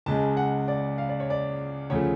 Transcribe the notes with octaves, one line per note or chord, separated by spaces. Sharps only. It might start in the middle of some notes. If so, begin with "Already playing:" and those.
C#2 C#3 G#3 A5
F#5
D5
F5
D5
C#5
D5
D2 C#3 F3 A3 C#5